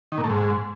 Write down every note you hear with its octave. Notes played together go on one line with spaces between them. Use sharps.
D#3
A#2
A3
G#2